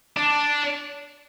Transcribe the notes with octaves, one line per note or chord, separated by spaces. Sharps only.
D4